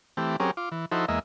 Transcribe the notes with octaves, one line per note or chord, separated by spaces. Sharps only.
E3 A3 C4 G4
F#3 C4 C#4 G4 G#4 A#4
F4 D6
E3
F3 D#4 E4 F#4 A4 C5
E2 G#3 A#3 D#5 E5